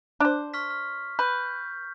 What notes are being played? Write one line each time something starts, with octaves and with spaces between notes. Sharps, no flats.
D4 C5
C#6 F6 B6
F6
B4 G6